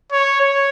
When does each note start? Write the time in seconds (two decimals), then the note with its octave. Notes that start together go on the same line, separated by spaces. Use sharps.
0.12 C#5
0.40 C#5